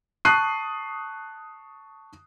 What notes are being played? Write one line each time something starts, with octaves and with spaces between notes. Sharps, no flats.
A5 C#6 D#6 F#6 C7 D#7